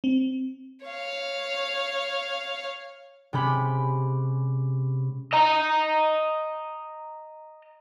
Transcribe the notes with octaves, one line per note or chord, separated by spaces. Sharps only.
C4
C#5 F5
C3 G#3 C#4 G4 B5
D#5 A#5